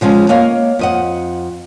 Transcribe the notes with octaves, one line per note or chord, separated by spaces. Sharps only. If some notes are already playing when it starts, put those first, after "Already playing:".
D3 F3 G#3 C#4
A#3 C#5 D#5 F5
F2 D#5 F#5